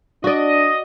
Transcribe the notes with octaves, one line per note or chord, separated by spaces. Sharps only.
D4 F#4 D5 D#5